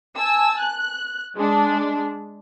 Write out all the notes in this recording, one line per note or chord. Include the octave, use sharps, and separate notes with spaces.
G#5 A5 E6
F#6
G#3 D4